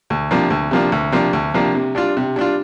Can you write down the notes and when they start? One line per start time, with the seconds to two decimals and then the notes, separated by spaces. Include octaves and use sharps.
0.10 D2
0.31 C3 F3 A#3 D4
0.50 D2
0.71 C3 F3 A#3 D4
0.92 D2
1.12 C3 F3 A#3 D4
1.33 D2
1.54 C3 F3 A#3 D4
1.75 C3
1.95 G3 D4 F4
2.17 C3
2.36 G3 D4 F4